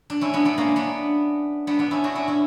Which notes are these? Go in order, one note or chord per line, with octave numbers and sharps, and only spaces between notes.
D4
C#4 E4
B3 D4
B3 D4
A#3 C#4
B3 D4
B3 D4
B3 D4
C#4 E4
D4 F#4
C#4 E4
C#4 E4